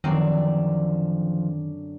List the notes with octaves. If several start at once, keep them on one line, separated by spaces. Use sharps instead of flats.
F#2 D3 D#3 F3 F#3 C4 D5